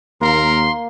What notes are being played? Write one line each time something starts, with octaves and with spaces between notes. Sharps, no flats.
D#2 A#3 A#4 C6